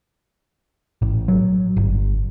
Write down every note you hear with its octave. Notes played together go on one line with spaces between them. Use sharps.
A1
F#3
G1